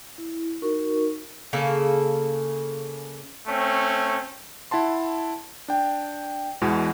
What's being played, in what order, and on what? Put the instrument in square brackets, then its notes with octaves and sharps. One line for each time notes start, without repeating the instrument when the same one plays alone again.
[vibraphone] E4
D#4 F#4 A#4 C#6
[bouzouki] C#3 A#3 A4
[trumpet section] A3 C4 C#4
[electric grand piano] E4 F#5 A5 C6
D4 G5
E2 B2 E3 G#3